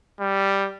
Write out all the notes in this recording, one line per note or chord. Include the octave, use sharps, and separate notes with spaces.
G3